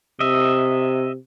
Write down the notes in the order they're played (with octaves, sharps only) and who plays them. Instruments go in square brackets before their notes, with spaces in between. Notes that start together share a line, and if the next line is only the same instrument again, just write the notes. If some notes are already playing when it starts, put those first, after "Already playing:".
[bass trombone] C3 [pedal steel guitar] D#5 E5